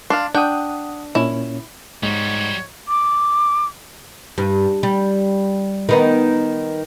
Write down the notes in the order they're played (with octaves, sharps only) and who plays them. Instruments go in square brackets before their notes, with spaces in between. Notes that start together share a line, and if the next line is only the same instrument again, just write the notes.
[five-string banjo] D4 [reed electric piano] F5 C6
[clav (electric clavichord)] D4 [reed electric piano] F#5 D#6 [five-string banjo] G5
[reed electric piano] A#2 C#4 [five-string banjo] E4
[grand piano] G#2 [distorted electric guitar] G3 F#4 [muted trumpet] C#5
[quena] D6
[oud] G2
G3
D#3 B3 D#4